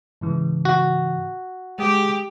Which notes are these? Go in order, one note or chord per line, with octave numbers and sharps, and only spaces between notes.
G#2 C#3 E3
F#4
G#3 G4 G#4 D#6